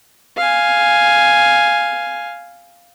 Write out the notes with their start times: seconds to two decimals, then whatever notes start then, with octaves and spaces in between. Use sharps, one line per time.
0.38 F5 G#5